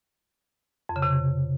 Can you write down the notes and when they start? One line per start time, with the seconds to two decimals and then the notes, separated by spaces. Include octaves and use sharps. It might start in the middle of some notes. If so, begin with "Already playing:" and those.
0.89 F2
0.96 C#3
1.02 C3